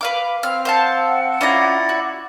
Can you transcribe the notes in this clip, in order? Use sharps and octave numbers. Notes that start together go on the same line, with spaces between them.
B4 F5 D6
C4 F5 F6
C5 F5 F#5 A5
C#4 E4 F4 D5 A#5
F#4